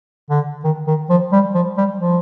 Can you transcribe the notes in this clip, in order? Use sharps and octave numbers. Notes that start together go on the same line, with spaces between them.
D3
D#3
D#3
F3
G3
F3
G3
F3